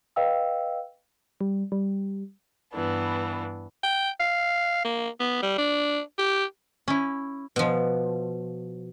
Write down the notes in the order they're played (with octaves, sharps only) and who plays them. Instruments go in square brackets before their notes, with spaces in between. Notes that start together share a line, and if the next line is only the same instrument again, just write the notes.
[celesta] B4 D#5 F5 G5 E6
[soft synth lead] G3
G3
[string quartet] G2 E3 B3 D4
[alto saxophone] G5
F5
A#3
B3
G3
D4
G4
[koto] C#4 E4
[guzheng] B2 F3